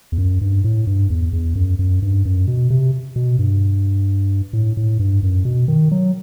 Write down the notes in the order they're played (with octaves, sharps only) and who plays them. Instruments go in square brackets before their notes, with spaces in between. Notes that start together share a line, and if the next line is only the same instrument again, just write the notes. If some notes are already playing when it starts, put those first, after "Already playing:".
[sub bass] E2
F#2
G2
A2
G2
E2
E2
F#2
F#2
G2
F#2
B2
C3
B2
G2
A2
A2
G2
F#2
B2
D#3
F#3